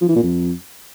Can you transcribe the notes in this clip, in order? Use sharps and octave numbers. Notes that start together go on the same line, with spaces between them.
F3
E3
A#2
F2